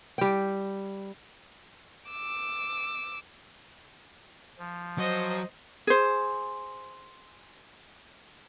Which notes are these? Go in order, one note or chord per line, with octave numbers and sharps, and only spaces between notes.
G3 G5
D6 E6
F3
F#3 C5 D#5
G#4 C5